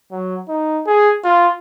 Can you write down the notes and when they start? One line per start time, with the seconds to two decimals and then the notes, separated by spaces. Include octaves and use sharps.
0.12 F#3
0.49 D#4
0.86 G#4
1.24 F4